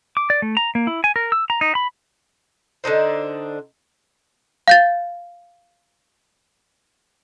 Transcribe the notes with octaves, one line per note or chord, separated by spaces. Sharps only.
D6
D5
A3
A#5
A#3
E4
G#5
A#4
E6
A#5
D#4
B5
D3 D4 D#4 C5
F5 G6 A6